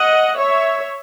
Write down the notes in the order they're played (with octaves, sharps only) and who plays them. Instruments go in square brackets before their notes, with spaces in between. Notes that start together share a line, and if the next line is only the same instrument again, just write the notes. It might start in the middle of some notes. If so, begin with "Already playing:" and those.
Already playing: [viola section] D#5 F#5
C#5 E5